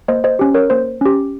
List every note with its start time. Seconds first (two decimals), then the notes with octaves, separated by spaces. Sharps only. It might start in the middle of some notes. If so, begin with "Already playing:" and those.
0.08 A#3 C5 D#5
0.24 C5 D#5
0.39 C#4 G4
0.54 A#4 C#5
0.70 A#3 C5
1.01 C#4 G4